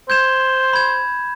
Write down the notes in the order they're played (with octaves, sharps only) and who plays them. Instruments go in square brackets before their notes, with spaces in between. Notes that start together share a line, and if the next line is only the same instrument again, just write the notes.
[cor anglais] C5 [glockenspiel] G6 G#6 E7
[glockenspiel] B5 G#6